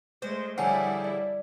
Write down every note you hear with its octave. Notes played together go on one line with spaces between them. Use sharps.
G#3 A3 C5
A2 D3 F3 G3 E4 G#4 C#5 F#5
D5